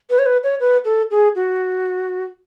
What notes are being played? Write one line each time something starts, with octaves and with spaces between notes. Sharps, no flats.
B4
C#5
B4
C#5
B4
A4
G#4
F#4